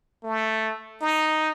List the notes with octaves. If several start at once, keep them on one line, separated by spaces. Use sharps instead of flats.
A3
D#4